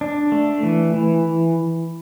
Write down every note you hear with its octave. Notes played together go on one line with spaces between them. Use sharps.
D4
A3
E3
E3